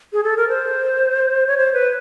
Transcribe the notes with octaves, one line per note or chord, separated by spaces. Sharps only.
G#4
A4
A#4
C5
C#5
C5
B4